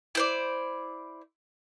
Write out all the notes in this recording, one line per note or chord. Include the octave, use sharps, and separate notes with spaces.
E4 C5 D5